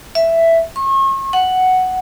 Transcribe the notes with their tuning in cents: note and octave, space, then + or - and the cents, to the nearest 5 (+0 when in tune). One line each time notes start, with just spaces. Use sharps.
E5 +5
C#6 -40
F#5 +5